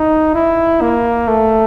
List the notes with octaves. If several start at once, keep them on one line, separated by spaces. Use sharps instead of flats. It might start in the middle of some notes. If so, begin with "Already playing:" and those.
Already playing: D#4
E4
A#3
A3